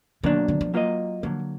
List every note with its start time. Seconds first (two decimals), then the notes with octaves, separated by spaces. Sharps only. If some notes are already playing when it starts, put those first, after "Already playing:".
0.23 B2 D#3 F#3 A#3 D4
0.48 D#3
0.61 F3
0.74 F#3 A#3 F4 A#4 D#5
1.23 D3 F3 F#3 A#3